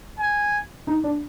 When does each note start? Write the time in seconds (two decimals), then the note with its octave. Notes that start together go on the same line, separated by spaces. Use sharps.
0.20 G#5
0.87 D#4
1.04 D4